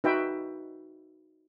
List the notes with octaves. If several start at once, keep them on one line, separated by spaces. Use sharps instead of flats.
D#4 F#4 B4 E5 G5